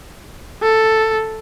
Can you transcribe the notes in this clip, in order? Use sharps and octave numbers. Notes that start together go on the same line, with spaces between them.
A4